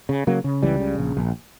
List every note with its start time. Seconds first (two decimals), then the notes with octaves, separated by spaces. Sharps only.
0.09 C#3
0.27 C#3 F#3 A#3
0.44 C#3
0.63 C#2 E3 G3
0.80 C#3
0.98 A#1
1.17 A#1